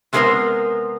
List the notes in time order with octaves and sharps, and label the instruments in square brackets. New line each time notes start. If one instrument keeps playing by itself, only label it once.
[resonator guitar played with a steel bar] C3 G#3 A3 B3 A#4 C5